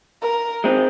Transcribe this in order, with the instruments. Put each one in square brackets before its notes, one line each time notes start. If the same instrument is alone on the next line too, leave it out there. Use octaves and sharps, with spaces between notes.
[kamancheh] A#4
[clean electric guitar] G#3 C4 D#4